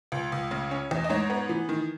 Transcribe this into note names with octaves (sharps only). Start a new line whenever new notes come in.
C#2
C#2
C#3
C#4
E2
D#5
G#2 C#5
B3
E3
D#3